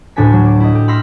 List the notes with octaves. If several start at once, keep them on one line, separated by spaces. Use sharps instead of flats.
D2 A2 D4 F#4 G#5 B6
F#3
D6
E4 D#5
G4
B5 C6 E6 F6 A#6 C7